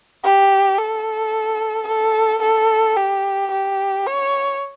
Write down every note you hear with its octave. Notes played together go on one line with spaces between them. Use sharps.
G4
A4
A4
A4
G4
G4
C#5